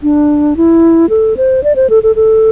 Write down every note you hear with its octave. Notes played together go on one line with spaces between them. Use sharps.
D4
E4
A4
C5
D5
C5
A4
A4
A4